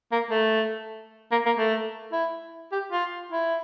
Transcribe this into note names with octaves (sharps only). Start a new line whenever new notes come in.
A#3
A3
A#3
A#3
A3
E4
G4
F4
E4